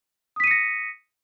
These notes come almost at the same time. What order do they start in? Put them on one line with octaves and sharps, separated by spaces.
D#6 B6 D#7 C#7 A#6